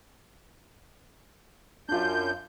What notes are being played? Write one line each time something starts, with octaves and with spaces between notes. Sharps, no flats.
F#2 D4 F4 G6